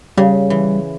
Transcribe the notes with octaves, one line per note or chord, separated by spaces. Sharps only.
C#3 G3
E3